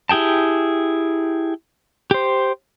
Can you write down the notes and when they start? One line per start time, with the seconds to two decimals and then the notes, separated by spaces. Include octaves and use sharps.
0.09 E4 G4 G#4 G5 A5
2.11 G4 C5